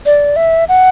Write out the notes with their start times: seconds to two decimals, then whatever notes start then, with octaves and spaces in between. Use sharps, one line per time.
0.06 D5
0.36 E5
0.69 F#5